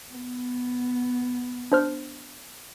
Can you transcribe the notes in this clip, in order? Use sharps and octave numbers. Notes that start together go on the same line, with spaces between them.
B3
D4 C5 F6